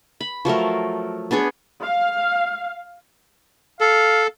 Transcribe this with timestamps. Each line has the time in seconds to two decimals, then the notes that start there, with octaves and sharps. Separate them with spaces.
0.21 B5
0.45 F3 F#3 A3 A#4
1.31 B3 D4 G#4 C#5
1.83 F5
3.81 A4 F5